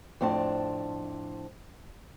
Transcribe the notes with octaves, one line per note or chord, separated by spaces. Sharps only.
F2 A2 C4 D4 A5